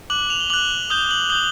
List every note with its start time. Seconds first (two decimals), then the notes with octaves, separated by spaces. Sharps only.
0.10 D6 F#6 F#7
0.30 F7
0.40 G7
0.50 D6 F#6 F#7
0.90 D#6 G6 G7
1.11 F#7
1.30 D#6 G6 G7